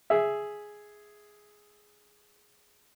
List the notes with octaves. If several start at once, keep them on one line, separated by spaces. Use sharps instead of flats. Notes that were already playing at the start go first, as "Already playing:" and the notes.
G#4 E5